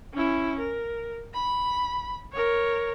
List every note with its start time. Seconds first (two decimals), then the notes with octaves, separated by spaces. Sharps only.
0.13 C#4 E4
0.58 A#4
1.34 B5
2.33 A#4 C#5